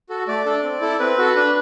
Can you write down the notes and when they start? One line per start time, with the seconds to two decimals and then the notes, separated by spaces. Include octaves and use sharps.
0.09 F#4 A4
0.28 A3 D5
0.46 D4 A4
0.63 C4
0.81 E4 A4
1.00 C4 B4
1.18 F#4 A4
1.36 D4